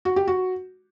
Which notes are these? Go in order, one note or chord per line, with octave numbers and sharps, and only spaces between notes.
F#4
G4
F#4